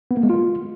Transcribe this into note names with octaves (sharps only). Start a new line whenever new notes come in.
B3
A#3
G#3
F4